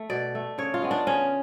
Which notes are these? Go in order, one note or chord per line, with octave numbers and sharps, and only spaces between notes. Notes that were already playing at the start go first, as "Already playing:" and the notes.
Already playing: A3
B2 D5
A3
C#3 C#5
F4
G#3 B3
D4
C#3 C#4